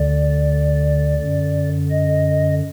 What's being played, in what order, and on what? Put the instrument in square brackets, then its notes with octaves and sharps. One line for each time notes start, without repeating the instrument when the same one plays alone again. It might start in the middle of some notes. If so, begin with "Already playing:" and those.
Already playing: [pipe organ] D2 D3 D5
F#2 D3
D#5